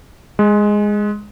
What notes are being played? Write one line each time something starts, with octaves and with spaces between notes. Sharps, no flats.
G#3